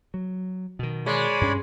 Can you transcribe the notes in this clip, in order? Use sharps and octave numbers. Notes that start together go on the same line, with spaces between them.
F#3
B2 D#3
G#3 C#5 D5 B5
G2 C#4